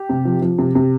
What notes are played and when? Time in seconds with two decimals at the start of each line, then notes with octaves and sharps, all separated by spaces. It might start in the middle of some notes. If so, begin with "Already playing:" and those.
Already playing: G4
0.09 C3
0.25 F3
0.42 F3
0.59 C3
0.75 C3